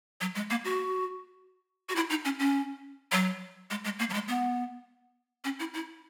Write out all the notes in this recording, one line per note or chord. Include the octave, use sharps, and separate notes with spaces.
F#3
G#3
A#3
F#4
F#4
E4
D#4
C#4
C#4
F#3
G#3
G#3
A#3
F#3
G#3
B3
C#4
E4
E4